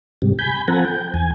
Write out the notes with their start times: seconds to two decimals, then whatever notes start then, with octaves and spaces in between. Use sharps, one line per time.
0.22 G#2 C3 G3
0.39 G#5 B5 G6
0.68 F3 C4 A4 F#5 G#5 A#5
0.85 G5
1.14 E2 G#5